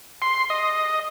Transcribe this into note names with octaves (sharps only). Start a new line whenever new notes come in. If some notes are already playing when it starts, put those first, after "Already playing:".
C6
D#5